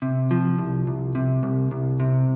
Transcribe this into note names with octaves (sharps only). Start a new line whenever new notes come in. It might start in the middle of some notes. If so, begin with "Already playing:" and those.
C3
F3
C2
C2
C3
C2
C2
C3